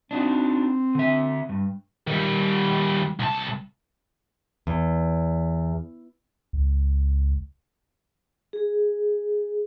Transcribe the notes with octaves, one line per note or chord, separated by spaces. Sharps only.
C4 D4 D#4 F#4
D3 E5
G2
D#3 G3
C2 A5
E2
C#2
G#4